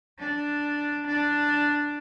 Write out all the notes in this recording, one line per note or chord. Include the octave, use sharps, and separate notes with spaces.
D4
D4